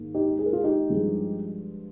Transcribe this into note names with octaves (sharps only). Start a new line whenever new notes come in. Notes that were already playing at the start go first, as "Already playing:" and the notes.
Already playing: G#2 D#3 A#3
D#4 G4
G#4
A#4
F4 G#4
D#4 G4
G2 F3 G#3